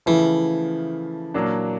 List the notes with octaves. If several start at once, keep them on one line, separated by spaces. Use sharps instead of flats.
C#3 E3 F3 A3
A#2 F#3 A#3 D4